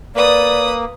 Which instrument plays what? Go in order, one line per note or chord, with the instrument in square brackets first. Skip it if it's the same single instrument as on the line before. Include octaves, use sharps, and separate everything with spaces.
[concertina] A#3 [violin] B4 D#6 [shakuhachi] D5